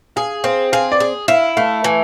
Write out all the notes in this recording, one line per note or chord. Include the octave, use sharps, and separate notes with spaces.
G#4 F5
C4 F5
G#4 F5
D5
G#4
E4 F5
A3 F5
E3 G#5